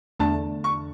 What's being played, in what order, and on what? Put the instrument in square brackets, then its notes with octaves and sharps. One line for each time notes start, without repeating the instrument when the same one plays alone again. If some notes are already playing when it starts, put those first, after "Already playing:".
[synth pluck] E2 D3 A3 D4 [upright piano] A5
[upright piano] C#6